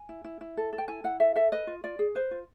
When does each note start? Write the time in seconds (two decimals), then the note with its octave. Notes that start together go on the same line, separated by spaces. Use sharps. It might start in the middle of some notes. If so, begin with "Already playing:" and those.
Already playing: G#5
0.09 E4
0.24 E4
0.41 E4
0.57 A4
0.73 A4
0.78 G5
0.88 E4 G#5
1.04 E4 F#5
1.20 A4 E5
1.36 A4 E5
1.52 B4 D#5
1.67 F4
1.84 F4 D5
1.99 G#4
2.15 B4 C5
2.31 F4